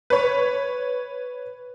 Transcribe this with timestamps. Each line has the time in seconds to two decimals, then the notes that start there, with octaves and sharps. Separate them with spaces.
0.10 B4 C#5